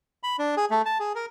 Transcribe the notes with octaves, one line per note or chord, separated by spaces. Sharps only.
B5
D4
G#4
A3
A5
G#4
A#4